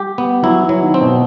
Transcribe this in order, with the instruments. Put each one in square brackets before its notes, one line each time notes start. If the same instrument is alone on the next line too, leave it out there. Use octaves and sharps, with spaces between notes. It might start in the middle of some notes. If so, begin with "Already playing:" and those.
Already playing: [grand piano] G3 [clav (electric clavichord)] G4
[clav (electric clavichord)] B3
[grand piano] F#3 [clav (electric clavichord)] E4
[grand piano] E3
[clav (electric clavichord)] F#3
[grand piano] D#3
[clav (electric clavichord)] C4
[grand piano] B2